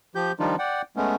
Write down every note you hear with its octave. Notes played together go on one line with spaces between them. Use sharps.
F3 G4 G6
D#3 F3 G3 D4 D#4 F4
D5 F#5 G5
G#3 A3 B3 C#4